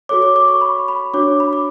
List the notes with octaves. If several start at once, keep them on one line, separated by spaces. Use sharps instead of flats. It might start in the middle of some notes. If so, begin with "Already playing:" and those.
F#4 A4 C#5 D6
D6
D6
C#6
B5
C#6
B5
D4 F#4 C#5 D6
B5
D6